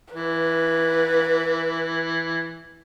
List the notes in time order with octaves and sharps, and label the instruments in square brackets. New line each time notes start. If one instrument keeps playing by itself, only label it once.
[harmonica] E3 [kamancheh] B4